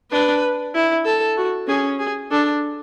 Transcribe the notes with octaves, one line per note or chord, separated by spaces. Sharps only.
D4 B4
E4
A4
F#4
C#4 G#4
G#4
D4 A4